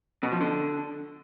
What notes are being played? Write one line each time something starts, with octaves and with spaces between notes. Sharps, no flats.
B2
F3
D3